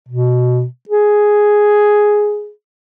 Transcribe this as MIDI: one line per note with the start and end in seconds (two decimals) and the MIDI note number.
0.09 0.65 47
0.89 2.50 68